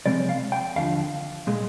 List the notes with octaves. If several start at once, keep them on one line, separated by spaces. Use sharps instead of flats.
C3 F3 G#3 C4 D5
F5
G5
D#2 D3 F3 F5
A#2 G#3